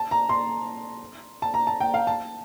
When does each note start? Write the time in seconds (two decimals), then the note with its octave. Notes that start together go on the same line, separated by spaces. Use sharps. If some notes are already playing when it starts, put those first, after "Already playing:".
Already playing: A5
0.11 A#5
0.29 C6
1.42 A5
1.54 A#5
1.67 A5
1.80 G5
1.94 F5
2.07 A5